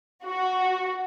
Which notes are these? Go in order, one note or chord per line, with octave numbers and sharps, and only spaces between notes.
F#4